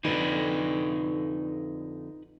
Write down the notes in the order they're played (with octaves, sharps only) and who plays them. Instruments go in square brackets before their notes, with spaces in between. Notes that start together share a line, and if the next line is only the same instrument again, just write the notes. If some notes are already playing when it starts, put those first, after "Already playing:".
[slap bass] F2 D3 [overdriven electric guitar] D#4 B4